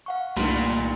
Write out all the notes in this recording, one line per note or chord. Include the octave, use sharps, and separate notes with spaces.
F5 F#5 C#6
C2 G2 A#2 D#3 A3 B5 C6